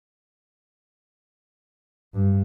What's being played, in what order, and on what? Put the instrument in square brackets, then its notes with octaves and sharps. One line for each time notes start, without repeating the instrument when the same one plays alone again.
[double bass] G2